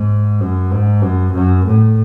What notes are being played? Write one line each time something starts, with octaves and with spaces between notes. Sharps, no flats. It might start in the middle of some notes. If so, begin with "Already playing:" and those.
Already playing: G#2
F#2
G#2
F#2
F#2
A2